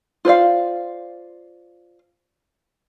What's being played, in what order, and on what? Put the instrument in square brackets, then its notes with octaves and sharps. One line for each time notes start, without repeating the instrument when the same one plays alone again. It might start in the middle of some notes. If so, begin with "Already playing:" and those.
[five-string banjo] F4 C5 D5 F5